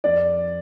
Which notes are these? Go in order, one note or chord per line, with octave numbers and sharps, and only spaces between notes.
F2 D5